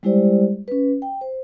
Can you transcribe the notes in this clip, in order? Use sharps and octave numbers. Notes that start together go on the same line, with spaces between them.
G3 G#3 E4 G4 C5 D5
C#4 B4
G5
C5